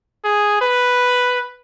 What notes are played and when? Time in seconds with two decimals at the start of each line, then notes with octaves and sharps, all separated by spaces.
0.25 G#4
0.61 B4